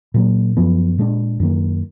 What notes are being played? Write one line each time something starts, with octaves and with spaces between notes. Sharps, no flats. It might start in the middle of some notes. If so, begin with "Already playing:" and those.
A#2 F#3 A#3
F#2 F3 B3
A#2 G#3 B3 D4
F#2 D#3 A#3